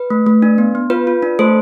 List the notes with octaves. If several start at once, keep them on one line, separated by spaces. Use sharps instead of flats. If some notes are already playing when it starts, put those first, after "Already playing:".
Already playing: B4
A3
A3
D4
B3
B3
F4 B4
F4
D4
A3 A4 C5